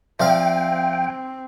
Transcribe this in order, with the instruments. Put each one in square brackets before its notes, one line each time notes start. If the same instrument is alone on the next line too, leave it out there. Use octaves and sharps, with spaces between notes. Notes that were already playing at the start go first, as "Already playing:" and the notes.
[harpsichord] F3 D5 F5 [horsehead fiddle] C4 [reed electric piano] E5 [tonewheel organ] G5